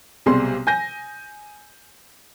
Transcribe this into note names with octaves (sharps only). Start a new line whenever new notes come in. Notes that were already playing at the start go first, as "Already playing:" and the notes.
B1 C3 G3 G#4 C6
G#5 G6 A#6